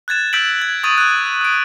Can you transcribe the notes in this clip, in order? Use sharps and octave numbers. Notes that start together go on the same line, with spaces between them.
F#6 G#6 A6 E7
E6 G6 A6 B6 D7 F#7
G#6
C#6 D#6 A6 D#7 F#7
D#6 F#6
D#6 D7